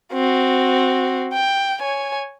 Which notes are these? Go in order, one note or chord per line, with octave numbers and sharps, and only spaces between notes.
C4 F#4
G5
C#5 G#5